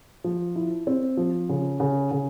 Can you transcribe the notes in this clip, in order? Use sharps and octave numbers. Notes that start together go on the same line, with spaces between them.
F3
E4
C4
F3
C#3
C#3
C#3